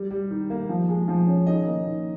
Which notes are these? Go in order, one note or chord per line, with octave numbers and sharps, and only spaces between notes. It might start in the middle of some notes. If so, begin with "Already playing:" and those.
Already playing: G3
G3
D#3
A#3
F3
G#3
F3
C#4
D#3 D#5
A#3
D#3